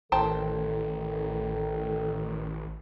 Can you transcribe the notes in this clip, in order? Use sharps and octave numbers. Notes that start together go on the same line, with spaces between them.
A1 D#3 A4 C5 G5 A5